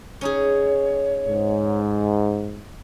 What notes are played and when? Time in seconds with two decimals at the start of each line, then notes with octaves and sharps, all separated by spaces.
0.21 C#4 D#4 G#4 C#5
1.27 G#2